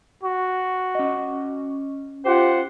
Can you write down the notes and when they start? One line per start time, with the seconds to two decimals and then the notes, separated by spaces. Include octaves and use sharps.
0.23 F#4
0.95 C#4 D#5
2.26 F4 G4 C5 F#5